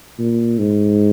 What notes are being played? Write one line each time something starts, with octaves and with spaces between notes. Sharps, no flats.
A#2
G#2